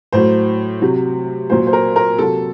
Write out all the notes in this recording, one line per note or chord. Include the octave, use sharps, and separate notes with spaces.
A2 F#3 C5
C3 F#3
A#2 F#3 C5
C5
A#4
A#4
C3 F#3 A4